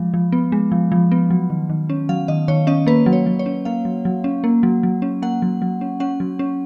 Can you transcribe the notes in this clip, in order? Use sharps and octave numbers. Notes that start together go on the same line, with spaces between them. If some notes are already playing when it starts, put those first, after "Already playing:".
Already playing: F3 G#3
F3
B3
G#3
F3
F3
B3
F#3
D#3
D#3
C#4
F#3 F5
D#3 D#5
D#3 C#5
C#4 D#5
A#3 B4
F#3
C#5
F#3
C#5
C#4
A#3 F5
F#3
F#3
C#4
A#3
F#3
F#3
C#4
A#3 F#5
F#3
F#3
C#4
C#4 F#5
F#3
C#4